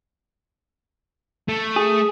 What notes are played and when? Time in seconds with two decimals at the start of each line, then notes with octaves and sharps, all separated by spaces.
1.49 A3
1.76 G#4